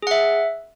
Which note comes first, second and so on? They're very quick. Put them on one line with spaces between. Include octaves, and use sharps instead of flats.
G#4 F#5 E5